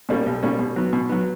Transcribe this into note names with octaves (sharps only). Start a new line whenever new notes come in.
B2 G3 A#3 C#4
B1
B2 G3 A#3 C#4
B2
F#3 B3
B2
F#3 B3